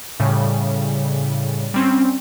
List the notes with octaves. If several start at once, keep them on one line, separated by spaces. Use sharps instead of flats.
A2 C#3 G3
G3 C4 C#4